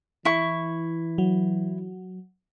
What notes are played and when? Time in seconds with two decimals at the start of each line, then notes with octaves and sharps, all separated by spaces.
0.25 E3 E4 C#6
1.18 F#3